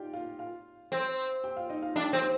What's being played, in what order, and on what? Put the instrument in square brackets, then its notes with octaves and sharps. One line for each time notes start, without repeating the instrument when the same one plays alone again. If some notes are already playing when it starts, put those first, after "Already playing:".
Already playing: [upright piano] D#4 F4 G4 D5 F5 G5
F4 F5
F4 F5
[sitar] C4
[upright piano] G4 G5
F4 F5
D#4 D#5
F4 F5
[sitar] D4 [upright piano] G4 G5
[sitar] C4
[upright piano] G4 G5